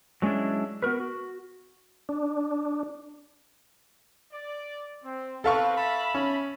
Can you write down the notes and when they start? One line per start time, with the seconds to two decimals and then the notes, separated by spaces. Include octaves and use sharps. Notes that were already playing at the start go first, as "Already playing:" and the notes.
0.22 F#3 G#3 C#4 D4 E4
0.82 B3 F#4 A#4 B4
1.00 F#4
2.09 D4
4.32 D5
5.03 C4
5.44 C4 A4 B4 F5 C#6
5.78 E5 A5 B5
6.15 C#4